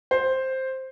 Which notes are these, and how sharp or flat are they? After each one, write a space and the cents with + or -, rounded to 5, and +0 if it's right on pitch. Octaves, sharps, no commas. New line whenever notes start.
C5 +5